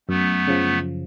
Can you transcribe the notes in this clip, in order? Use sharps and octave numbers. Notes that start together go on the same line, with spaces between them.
F#2 A3 B3
C#3 F3